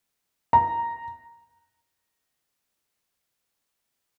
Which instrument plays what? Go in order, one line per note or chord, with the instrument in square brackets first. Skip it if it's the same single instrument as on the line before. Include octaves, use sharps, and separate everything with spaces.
[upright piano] A#5